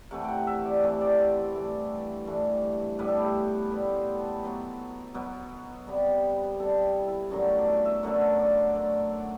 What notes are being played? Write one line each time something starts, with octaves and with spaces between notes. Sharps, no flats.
C3 E3 A3 F#5
F#5 G5
E5
D5
C3 E3 A3 D5
D5
C5
B4
G2 E3 A3
G2 E3 A3
A2 G3 B3 B4
A4
G4
A4
A2 G3 B3 B4
C5
A4 B4
C5
B2 F#3 B3 B4
B2 F#3 B3
C3 G3 B3
C3 G3 B3 A4
E4
E4
F#2 D3 F#3 A3 F#4
F#4
D5
E5
E5
F#2 D3 F#3 A3 F#5
E5
D5
C5
F#2 F#3 A3 D5
E5
F#5